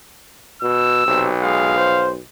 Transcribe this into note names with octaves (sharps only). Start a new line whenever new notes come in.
B2 E6
B1 C3
G#3 F5
C5